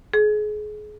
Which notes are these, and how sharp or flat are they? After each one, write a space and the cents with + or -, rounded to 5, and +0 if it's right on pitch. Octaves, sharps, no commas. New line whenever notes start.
G#4 +30